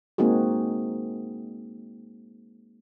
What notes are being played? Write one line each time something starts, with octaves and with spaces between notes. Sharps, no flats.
G#3 A#3 C4 D#4 F#4 G#4